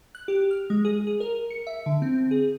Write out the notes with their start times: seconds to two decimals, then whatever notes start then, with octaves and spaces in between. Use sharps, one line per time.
0.15 F#6
0.28 G4
0.51 F6
0.70 G#3
0.85 G#4
1.07 G#4
1.20 A#4
1.51 C#7
1.67 E5
1.86 D3
2.02 C4
2.31 G#4